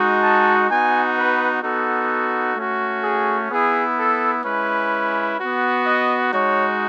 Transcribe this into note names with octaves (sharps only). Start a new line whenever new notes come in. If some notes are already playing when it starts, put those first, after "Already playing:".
Already playing: G#3 D#4 F#4
A5
B3 D#4 F#4 G#5
B4
B3 D#4 F#4 A4
A3 C#4 F#4
G#4
B3 E4 G#4
A4
G#3 C#4 E4 B4
B3 F#4
D#5
G#3 D#4 F#4 C#5